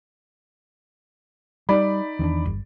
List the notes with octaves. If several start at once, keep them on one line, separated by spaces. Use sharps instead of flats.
G3 D#4 D5 B5
E2 D#3 C#4 D4
G1